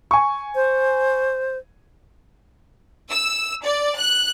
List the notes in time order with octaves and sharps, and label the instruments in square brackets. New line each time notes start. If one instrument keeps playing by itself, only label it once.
[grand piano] G#5 C#6
[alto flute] C5
[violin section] E6
D5
F#6